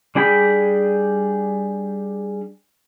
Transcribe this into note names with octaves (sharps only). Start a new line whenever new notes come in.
G3 D4 G#4 G5 B5